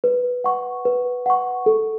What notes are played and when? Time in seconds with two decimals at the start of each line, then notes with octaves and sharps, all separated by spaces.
0.04 B4
0.44 F#5 C#6
0.85 B4
1.26 F#5 C#6
1.66 A4